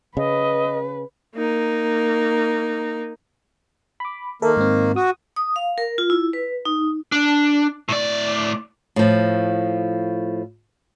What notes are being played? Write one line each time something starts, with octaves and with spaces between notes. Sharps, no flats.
C#3 B4 D#5
A#3 D#4
B5 D6
D#3 A#3 A4 A#4 E5
G#2 C4
F#4 D#6
D#6
F5
A#4
F4
E4
B4
D#4
D4
A2 D5
A2 F3